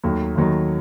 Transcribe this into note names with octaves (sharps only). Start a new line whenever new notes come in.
D#2 D#3 F#3 A3
D#2 D#3 F#3 A3